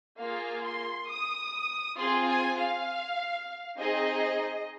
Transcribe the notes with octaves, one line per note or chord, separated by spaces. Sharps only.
A#3 F4 G#4 F5
C6
D#6
C4 F4 G#4 C6
G#5
F5
C4 D#4 G#4 D#5